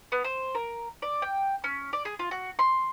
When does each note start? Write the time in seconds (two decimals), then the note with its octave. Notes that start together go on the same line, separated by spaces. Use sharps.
0.12 B3
0.24 C5
0.55 A#4
1.02 D5
1.22 G5
1.64 C#4
1.93 D5
2.05 G#4
2.19 F4
2.31 F#4
2.59 C6